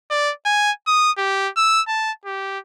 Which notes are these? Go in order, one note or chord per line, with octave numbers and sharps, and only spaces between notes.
D5
G#5
D#6
G4
E6
A5
G4